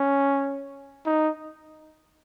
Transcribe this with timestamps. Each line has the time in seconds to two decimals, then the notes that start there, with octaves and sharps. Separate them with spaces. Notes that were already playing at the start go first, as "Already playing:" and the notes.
Already playing: C#4
1.06 D#4